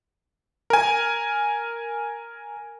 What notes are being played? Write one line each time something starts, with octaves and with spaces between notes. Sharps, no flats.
A#4 G#5